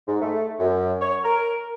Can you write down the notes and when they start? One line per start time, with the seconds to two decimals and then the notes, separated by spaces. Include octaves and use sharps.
0.07 G#2
0.22 A3
0.60 F#2
1.02 C#5
1.24 A#4